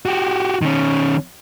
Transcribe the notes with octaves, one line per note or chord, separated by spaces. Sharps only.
F#4 G4
D#3 C#4